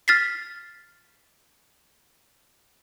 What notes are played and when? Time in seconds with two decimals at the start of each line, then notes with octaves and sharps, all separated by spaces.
0.08 F6 A6 B6 C7